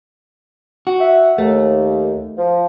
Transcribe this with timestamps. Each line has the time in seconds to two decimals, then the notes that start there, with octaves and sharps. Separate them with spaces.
0.87 F#4
0.99 E5 F#5
1.38 D#2 A3
2.38 F3